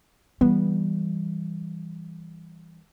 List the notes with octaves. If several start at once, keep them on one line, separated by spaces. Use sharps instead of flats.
E3 G3 B3